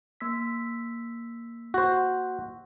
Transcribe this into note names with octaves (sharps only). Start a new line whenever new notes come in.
A#3 E6 B6
F#4 C5